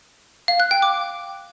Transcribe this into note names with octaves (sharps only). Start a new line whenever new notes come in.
F5
F#6
G5
D6